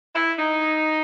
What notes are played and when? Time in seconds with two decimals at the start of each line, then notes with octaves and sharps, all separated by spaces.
0.16 E4
0.39 D#4